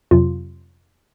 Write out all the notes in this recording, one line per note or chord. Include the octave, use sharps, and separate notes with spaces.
F2 C3 F#3 F4